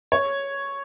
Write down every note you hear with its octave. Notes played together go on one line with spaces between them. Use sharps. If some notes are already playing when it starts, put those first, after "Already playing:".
C#5